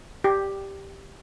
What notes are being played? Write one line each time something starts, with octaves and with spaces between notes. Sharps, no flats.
G4